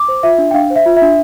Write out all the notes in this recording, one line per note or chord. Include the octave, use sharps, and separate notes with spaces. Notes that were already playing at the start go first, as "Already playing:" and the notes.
Already playing: D6
C5
F4 E5
D4
G5
D4 F5
C5
E5
F4
E5
D4